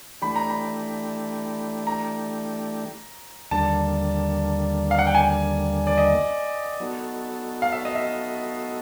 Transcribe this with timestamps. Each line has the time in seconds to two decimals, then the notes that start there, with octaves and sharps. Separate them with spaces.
0.22 E3 A3 D4 G4 B5
0.36 A#5
0.50 B5
1.87 A#5
3.51 D#2 D3 G3 A#3 D4 A5
4.91 F5
4.99 F#5
5.07 G5
5.15 G#5
5.87 D5
5.98 D#5
6.80 F#3 B3 D#4 F#4 A4
7.62 F5
7.73 E5
7.85 D#5
7.95 E5